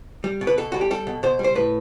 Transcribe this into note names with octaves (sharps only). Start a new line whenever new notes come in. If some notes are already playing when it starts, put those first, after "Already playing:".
G3
B2
B4
B2 A4
G3 F#4
G4
G3 A4
B2
B2 C5
G3
C5
A2 B4